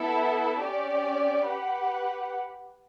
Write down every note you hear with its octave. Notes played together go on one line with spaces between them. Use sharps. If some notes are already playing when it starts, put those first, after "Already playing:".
Already playing: B3 E4 A4
C#4 G4 D5
G4 B4 F#5